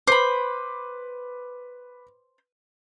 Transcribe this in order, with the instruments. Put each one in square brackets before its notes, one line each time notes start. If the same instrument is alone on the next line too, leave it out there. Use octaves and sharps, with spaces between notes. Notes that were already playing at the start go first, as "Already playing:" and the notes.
[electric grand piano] B4 D6 [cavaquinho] C5 B5